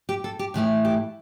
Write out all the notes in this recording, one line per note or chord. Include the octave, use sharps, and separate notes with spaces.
G4
A4
G4
A2 E3 A3 E4 G4
G4